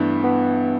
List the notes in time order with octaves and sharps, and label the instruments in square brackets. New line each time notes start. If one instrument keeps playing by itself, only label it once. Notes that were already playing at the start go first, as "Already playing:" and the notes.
Already playing: [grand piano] G2 E3 A3 E4 [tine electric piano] B3 D4
[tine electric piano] B3